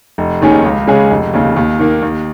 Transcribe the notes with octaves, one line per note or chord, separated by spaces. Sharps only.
F1
D#2 D#3 C#4 G#4
C#2
C#3 G#3 C#4 G#4
F1
D#2 C#3
D#2
D#3 A#3
D#2